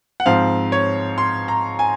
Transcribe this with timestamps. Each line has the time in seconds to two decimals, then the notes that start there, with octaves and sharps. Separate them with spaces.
0.20 F#5
0.26 G#2 F3 C4 F5
0.72 C#5
1.18 C6
1.48 A#5
1.79 G#5